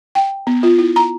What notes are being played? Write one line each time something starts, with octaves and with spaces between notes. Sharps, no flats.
G5
B3
F4
E4
A#5